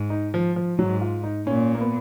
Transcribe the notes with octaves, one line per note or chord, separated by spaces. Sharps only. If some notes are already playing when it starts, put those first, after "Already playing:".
Already playing: G#2
D#4
F3
F3
G#2 F#3
F4
D#4
A#2 C#4
A#3
B3